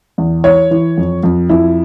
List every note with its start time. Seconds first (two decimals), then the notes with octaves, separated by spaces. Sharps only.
0.18 E2
0.44 E3 C#5
0.71 E3
0.97 F2
1.23 F2
1.49 F2 E4